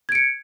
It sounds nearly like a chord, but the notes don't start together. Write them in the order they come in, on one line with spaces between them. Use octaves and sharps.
G#6 D7 C#7